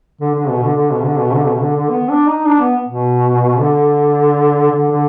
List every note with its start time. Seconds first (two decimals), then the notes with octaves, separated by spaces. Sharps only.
0.21 D3
0.35 D3
0.49 B2
0.63 D3
0.76 D3
0.92 B2
1.05 D3
1.19 B2
1.34 D3
1.47 B2
1.61 D3
1.76 D3
1.90 B3
2.09 D4
2.27 D#4
2.45 D4
2.60 B3
2.88 B2
3.59 D3
4.71 D3
4.91 D3